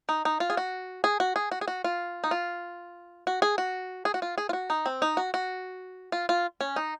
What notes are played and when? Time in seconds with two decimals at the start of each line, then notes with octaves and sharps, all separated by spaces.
0.09 D#4
0.25 D#4
0.40 F4
0.50 G#4
0.57 F#4
1.04 G#4
1.20 F#4
1.36 G#4
1.51 F#4
1.61 G#4
1.68 F#4
1.84 F4
2.24 D#4
2.31 F4
3.27 F#4
3.42 G#4
3.58 F#4
4.05 G#4
4.14 F#4
4.22 F4
4.38 G#4
4.49 F4
4.53 F#4
4.70 D#4
4.86 C4
5.02 D#4
5.17 F#4
5.34 F#4
6.12 F4
6.29 F4
6.61 C#4
6.76 D#4